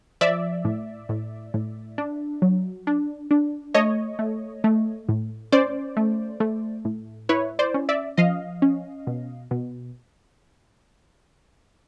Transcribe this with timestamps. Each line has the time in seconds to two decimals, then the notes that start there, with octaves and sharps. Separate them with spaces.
0.21 F3 D5 E5
0.65 A2
1.09 A2
1.54 A2
1.98 D4
2.42 F#3
2.87 D4
3.31 D4
3.74 A3 C#5 D#5
4.19 A3
4.64 A3
5.09 A2
5.52 C#4 C5 D5
5.97 A3
6.40 A3
6.85 A2
7.29 E4 B4 C#5
7.59 C5 D5
7.74 C#4
7.89 D5 E5
8.17 F3 D#5 F5
8.62 C#4
9.07 B2
9.51 B2